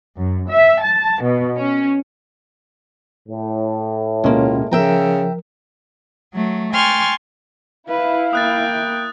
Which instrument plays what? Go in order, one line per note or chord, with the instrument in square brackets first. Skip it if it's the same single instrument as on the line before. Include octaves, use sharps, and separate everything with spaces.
[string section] F#2
E5
A5
B2
C#4
[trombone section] A2
[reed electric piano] D2 B2 C#4 [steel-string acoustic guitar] G#3 A#3 [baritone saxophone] F4
[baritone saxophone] C#3 [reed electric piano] F3 A#4 [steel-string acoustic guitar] E5 G5 A#5
[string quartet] F#3 A3
G5 G#5 C6 C#6 F6 A6
[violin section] E4 [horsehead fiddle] B4 [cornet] F5
[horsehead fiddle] A#3 G5 [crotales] D#6 F#6 A6